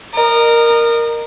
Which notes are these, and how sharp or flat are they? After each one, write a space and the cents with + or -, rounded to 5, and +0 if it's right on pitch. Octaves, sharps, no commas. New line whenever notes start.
A#4 +0 D#5 -30